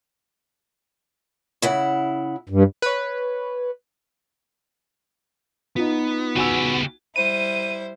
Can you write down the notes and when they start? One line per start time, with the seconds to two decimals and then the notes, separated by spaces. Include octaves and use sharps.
1.62 C#3 E4 F#5
2.49 G2
2.82 B4 C#5
5.76 B3 D#4 F4
6.36 C#3 F#4 G4 G#5 E6
7.16 G3 E4 C5 D#7